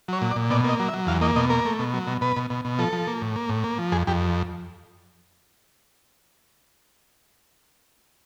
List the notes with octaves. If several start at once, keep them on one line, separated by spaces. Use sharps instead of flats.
F#3 C#5
A#2
D5
A#2
B2 D5
A#3 D#5
F#3
E5
F#3
E2 F5
A#3 D#5
B2 D#5
A#3 A#4
A3
B2
F#3
B2
B2 B4
B2
B2
B2
F3 A4
F3
A#3
A2
A#3
A2
A#3
F3
F2 G#4
F2 G4